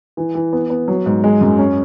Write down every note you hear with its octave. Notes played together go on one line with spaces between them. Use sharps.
E3
E3
B3
B3
F#3
G#2
G#3
F#2
C#4